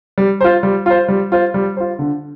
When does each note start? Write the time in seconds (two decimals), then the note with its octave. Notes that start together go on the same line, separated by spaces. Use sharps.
0.18 G3
0.41 F4 C5
0.63 G3
0.86 F4 C5
1.08 G3
1.32 F4 C5
1.54 G3
1.77 F4 C5
1.99 D3